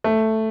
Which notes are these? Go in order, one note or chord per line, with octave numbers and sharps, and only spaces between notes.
A3